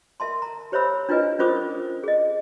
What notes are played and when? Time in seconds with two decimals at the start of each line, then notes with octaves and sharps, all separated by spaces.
0.20 A#4 E5 A5 C6
0.42 A#5
0.72 G4 C5 C#5 E5 B5 E6
1.09 D4 E4 F4 B4 D#5 G#5
1.39 C#4 F4 A#4 C5 D6 D#6
2.04 G#4 D#5